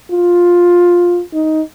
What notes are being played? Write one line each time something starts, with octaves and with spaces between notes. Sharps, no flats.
F4
D#4